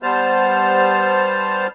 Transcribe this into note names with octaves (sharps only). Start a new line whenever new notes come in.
G3 B3 C5 A5 F6